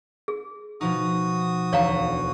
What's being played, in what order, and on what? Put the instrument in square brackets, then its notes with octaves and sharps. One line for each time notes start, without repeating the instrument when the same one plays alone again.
[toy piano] G#4
[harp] B2 F3 D#4 [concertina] F#4 D#6
[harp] E1 D2 C#6 [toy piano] C#5 F5 A#5